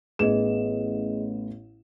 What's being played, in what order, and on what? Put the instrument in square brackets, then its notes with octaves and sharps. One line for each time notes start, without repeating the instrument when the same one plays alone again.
[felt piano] A1 B3 E7 [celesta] G#4 D#5